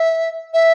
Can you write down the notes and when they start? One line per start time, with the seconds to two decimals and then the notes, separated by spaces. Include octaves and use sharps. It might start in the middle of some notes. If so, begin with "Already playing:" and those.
Already playing: E5
0.54 E5